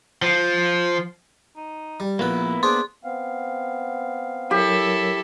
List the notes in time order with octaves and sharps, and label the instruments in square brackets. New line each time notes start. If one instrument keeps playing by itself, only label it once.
[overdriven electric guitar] F3
[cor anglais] D#4
[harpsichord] G3
[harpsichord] A#1 B4 [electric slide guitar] A#3 B3 [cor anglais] E4
[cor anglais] D4 [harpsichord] G#4 C5 [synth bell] C6
[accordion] B3 C4 F5
[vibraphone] F#3 A#4 C#5 [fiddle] E4 A4 [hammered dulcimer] G4